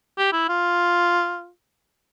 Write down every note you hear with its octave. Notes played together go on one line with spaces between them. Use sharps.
G4
E4
F4